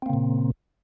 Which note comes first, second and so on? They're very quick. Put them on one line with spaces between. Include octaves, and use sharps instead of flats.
C4 A#3 C#3 A#2